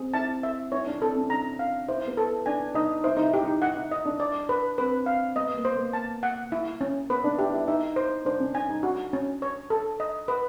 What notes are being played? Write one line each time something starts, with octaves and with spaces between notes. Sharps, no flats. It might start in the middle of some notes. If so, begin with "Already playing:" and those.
Already playing: C4 G#4
E4 A5
E5
E4 C#5
D4
C4 A4
C#4
D4 A#5
F5
E4 C5
B3
A4
D4 G#5
D#4 D#5
E4 C5
D#4
E4
G4
D#4
D#4 F#5
E4
D#5
D4
D5
B4
C4 B4
F5
B3 D#5
A#3
C5
A#3
A5
F#5
E4
C#4
B3 B4
D4
E4 G4
E4
D#4 E5
C5
D4 C5
C#4
D4 G#5
D#4
D4 F#4
C#4
C#5
A4
D#5
B4